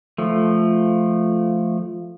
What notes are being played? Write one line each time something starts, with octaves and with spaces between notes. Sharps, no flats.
F3 A3